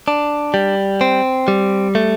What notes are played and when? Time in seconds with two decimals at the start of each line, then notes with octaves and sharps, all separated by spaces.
0.08 D4
0.54 G3
1.01 C4
1.48 G3
1.95 A3